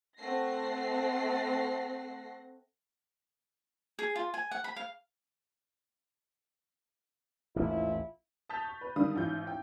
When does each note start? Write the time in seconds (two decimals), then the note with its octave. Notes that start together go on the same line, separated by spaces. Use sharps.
0.18 A3 C4 F#5 A#6 C7
3.99 G#4
4.16 F4
4.34 G#5
4.51 F#5
4.64 B5
4.76 F5
7.56 A1 D#2 G#2 E4 F4
8.49 A5 D#6 G6 A6 B6 F7
8.65 C#6
8.81 B4
8.96 D3 D#3 G3 F5 D#6
9.16 A1 G#2 F4 G6
9.47 G5